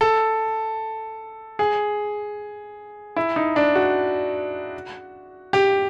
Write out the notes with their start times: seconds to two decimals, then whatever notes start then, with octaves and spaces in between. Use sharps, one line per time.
0.01 A4
1.59 G#4
3.16 E4
3.36 D#4
3.56 D4
3.75 F#4
5.53 G4